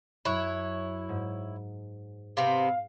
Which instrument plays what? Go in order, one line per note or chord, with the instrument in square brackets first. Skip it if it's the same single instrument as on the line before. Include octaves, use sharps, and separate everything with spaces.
[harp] F#2 F#6 [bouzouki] E4 C#5
[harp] G#2
[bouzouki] C3 B3 C4 [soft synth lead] F5